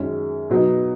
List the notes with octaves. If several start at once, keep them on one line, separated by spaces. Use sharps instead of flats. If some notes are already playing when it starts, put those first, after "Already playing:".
Already playing: F#2 D#3 G#3 C#4
B2 F#3 B3 D#4